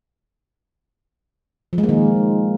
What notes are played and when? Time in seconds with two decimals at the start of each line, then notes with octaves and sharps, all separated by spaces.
1.73 F3
1.78 G#3
1.83 A#3
1.89 D#3